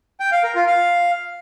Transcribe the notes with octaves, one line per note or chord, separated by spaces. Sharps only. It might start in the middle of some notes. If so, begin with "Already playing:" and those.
G5
F5
A#4
F4
F5